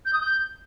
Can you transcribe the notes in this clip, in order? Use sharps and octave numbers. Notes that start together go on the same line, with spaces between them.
G6
D#6
G6